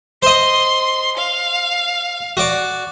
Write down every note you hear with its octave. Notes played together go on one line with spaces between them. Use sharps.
C5 D#5 C6
F5
F#4 D5